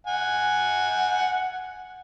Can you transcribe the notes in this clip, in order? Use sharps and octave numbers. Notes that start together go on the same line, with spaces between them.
F#5 G#5